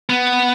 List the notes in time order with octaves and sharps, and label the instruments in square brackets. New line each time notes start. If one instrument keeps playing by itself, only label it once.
[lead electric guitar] B3